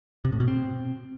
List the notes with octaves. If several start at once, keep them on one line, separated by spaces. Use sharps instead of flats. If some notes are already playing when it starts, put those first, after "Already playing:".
C3
A2
B2
C4